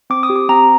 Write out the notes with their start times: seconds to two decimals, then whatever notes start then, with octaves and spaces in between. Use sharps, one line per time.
0.10 C4 D6
0.23 D#6
0.30 G4
0.36 D6
0.49 C4 A#5